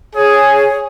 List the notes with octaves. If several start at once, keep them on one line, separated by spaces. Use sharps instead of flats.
G#4 C#5